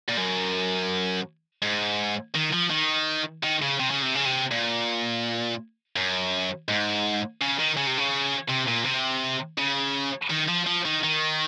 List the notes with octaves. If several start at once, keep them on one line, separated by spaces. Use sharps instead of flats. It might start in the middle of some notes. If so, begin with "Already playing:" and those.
A#2
F#2
G#2
D#3
F3
D#3
D#3
C#3
C3
C#3
C3
C#3
C3
A#2
F#2
G#2
C#3
D#3
C#3
C3
C#3
C3
A#2
C3
C#3
D#3
F3
F3
D#3
D#3